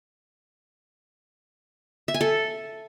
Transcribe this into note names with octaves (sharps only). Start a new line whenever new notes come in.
E5
G#5
A4